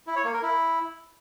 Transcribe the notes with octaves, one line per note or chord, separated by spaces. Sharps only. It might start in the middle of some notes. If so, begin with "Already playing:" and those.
E4
C#5
A#3
A#4
E4